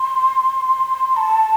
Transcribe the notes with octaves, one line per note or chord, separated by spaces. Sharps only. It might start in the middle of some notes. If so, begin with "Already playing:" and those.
Already playing: C6
A5